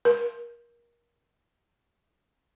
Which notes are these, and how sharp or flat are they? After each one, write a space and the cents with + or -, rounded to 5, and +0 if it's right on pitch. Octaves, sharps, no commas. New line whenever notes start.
A#4 +25